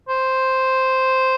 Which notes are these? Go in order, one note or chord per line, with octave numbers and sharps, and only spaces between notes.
C5